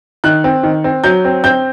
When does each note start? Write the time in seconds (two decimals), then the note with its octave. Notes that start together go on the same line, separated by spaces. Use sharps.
0.24 D#3 F#6
0.44 C4
0.63 D#3
0.84 C4
1.04 F#3 G6
1.25 C4
1.44 C4 G6